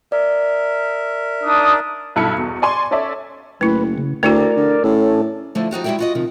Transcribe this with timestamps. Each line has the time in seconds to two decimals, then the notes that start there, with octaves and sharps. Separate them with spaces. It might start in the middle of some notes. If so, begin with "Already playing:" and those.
0.12 A#4 D5 E5
1.44 D4 D#4 D#6
2.16 B1 G2 E4 A4 B5 C#7
2.38 E2 B2
2.62 D5 G#5 C6 C#6
2.91 C#4 A4 C#5 D5 E5
3.61 F#1 A3 E4 B4
3.98 C#3
4.23 D2 A3 E4 F#4 A#4 D5
4.56 D3
4.84 A2 C#4 A4
5.55 D3 F3 A3 E4
5.71 F3 D#4 F#4 G4
5.84 G3 G#3 E4 F#4 E5 G5
5.99 F4 F#4 D#5
6.15 C3 D#3 F3